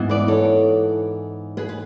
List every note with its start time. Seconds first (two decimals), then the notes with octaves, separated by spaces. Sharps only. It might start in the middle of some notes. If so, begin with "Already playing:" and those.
Already playing: G#2 E3 B3
0.09 B4 D5
0.28 A4 C#5
1.57 G#4 B4
1.69 B4